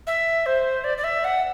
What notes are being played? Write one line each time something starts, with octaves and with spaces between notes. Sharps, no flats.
E5
C5
D5
D5
E5
F#5